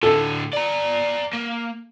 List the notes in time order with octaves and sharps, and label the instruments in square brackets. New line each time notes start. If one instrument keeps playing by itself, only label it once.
[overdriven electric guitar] A2 D3 [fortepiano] A4
[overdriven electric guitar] D5 A#5
A#3